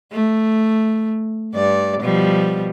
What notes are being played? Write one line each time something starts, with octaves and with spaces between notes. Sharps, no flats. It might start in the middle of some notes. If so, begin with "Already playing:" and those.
A3
G2 D5
B2 F3 G3